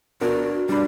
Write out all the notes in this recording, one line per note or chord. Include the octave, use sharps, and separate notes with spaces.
B3 D4 F#4 A#4
G3 D4 B5